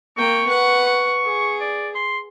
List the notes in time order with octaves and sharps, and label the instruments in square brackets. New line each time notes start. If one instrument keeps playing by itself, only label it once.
[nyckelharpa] A#3 G5 [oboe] C#6
[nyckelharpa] B4 F#5
[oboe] C#6
[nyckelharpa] G#4
[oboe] D5
C6